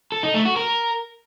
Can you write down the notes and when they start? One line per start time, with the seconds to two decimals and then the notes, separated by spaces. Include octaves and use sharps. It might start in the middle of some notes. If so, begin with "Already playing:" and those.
0.12 A4
0.23 D#4
0.34 A3
0.45 F#4
0.56 A#4